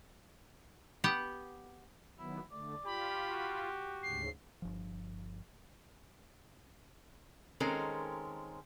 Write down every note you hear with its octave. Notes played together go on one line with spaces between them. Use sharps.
B3 G4 F#5
D#3 F#3 B3 E4
D3 A3 D5
F4 G4 B5
F#4
D2 G#2 C#3 C7
G1 F3
D#3 G#3 C4 C#4 A4 A#4